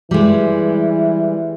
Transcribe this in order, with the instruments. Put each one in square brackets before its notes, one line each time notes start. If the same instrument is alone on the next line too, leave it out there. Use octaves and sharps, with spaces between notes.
[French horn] E3 [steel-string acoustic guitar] G3 G#3